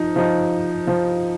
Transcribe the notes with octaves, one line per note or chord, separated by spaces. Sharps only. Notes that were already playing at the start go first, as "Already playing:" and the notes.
Already playing: F3 D#4
F3 D#4
F3